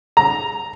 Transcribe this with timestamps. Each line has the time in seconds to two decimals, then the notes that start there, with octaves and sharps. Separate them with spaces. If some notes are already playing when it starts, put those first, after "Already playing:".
0.17 A#5